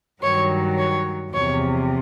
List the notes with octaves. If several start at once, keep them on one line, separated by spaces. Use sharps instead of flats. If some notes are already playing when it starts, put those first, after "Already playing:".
G2 D#3 F#3 C#5
C#5
E2 C3 F3 C#5